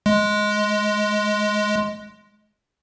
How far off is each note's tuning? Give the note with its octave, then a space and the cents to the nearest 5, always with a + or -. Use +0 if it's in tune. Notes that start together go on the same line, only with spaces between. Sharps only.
G#3 +10